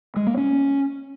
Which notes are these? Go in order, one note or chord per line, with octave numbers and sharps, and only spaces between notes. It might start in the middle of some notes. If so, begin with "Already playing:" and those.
G#3
A#3
C#4